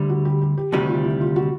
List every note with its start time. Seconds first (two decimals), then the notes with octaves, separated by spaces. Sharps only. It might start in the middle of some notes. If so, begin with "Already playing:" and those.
Already playing: D2 D3 G3
0.09 F#4
0.25 G4
0.41 G4
0.57 G4
0.72 D2 C3 D#3 G3 F#4
0.89 F4
1.04 E4
1.21 F4
1.36 F#4